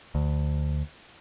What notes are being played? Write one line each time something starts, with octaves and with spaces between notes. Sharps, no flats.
D2